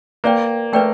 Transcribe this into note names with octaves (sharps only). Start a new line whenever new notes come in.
A#3 B4 D5 G5
A3 B4 D5 G5